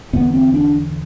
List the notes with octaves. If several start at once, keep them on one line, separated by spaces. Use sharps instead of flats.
E2 D3 B3
C4
D4